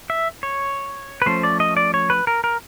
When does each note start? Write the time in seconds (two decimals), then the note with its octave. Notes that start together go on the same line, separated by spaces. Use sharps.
0.10 E5
0.43 C#5
1.22 B4
1.26 F3 A3 C#4 C5
1.43 D5
1.60 D#5
1.77 D5
1.94 C#5
2.10 B4
2.27 A#4
2.44 A#4